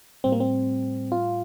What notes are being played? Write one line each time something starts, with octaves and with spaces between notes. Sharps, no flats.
A2 G3 C4
A#3
C4
F4